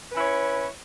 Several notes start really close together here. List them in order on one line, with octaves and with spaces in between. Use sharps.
B4 C#4 E4 C#5